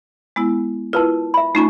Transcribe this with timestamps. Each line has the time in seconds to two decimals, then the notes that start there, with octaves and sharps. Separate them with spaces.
0.36 G#3 B3 E4
0.93 E4 F4 A#4 B4 A5
1.34 E5 B5
1.55 A3 C#4 D#4 F4 G#5 C#6